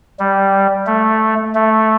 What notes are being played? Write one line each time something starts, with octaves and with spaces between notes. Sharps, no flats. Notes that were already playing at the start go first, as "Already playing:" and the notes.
G3
A3
A3